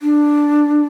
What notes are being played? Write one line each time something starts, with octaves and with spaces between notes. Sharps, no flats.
D4